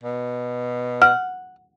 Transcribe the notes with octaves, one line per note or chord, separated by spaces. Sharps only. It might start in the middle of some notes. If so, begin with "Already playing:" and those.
B2
F#5 F6